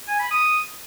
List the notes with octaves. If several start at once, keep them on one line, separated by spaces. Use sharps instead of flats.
G#5
B5
D#6